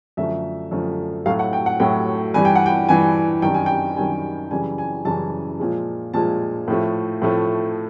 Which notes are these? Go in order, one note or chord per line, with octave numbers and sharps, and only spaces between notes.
F#2 D3 F3 A3 E5
F#2 D3 F3 A3
A2 F#3 A3 F5
F#5
G5
F#5
A2 F#3 A3 G5
G2 E3 G3 G#5
G5
F#5
G5
G2 E3 G3 G#5
F#2 D#3 G3 G5
G#5
G5
F#2 D#3 G3 G#5
F#2 C#3 E3 G3 G#5
G#5
F#2 C#3 E3 G3 A5
A#2 F3 G#3
A#2 F3 G#3 A5
A2 F3 A3
A2 F3 A3